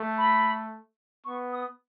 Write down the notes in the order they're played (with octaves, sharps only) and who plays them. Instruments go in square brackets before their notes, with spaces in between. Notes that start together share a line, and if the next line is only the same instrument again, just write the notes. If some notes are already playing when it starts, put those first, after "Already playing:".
Already playing: [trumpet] A3
[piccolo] B5
[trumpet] B3 [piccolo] C#6
[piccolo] D#6